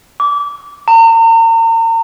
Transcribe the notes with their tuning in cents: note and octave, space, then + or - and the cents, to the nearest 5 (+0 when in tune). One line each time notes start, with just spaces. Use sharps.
D6 -25
A#5 -40